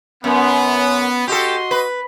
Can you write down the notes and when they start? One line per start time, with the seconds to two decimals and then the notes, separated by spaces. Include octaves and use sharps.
0.24 F#2 B3
1.28 F#4 G4 A4 D#5 C6
1.71 B4